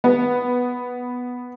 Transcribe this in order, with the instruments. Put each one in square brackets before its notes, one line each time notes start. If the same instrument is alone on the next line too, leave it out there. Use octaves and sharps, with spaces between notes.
[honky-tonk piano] B3